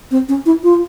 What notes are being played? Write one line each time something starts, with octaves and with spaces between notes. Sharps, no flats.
C4
C#4
E4
F4